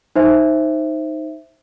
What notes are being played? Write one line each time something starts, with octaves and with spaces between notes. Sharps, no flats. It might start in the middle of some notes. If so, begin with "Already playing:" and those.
D#4 C5 E5